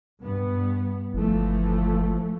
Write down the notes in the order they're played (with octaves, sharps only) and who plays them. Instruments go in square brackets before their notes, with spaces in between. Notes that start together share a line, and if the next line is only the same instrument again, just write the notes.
[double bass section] G2 B3
[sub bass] G1 [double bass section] E3 F3 A3